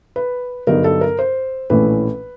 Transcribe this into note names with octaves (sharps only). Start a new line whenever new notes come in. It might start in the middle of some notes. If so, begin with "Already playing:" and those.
B4
G2 D3 F#3 B3 D#4 A#4
A4
A#4
C5
A#1 A2 E3 A3 C#4 B4